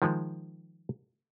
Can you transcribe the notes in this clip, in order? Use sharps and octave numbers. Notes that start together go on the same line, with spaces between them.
D#3 F3 G#3